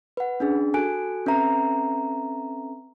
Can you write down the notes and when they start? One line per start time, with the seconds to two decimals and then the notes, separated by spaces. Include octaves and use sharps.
0.17 B4 F#5
0.40 C#4 D4 G#4
0.74 F#4 A4 G#5 F#6 D7
1.26 C4 C#4 A4 B4 E5 A#5